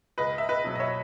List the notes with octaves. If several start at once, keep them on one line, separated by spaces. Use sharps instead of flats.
C#2 B4 D#5
E5
B4 D#5
B2 F#3
D#5
C#5 E5